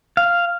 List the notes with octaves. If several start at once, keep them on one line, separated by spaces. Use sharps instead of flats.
F5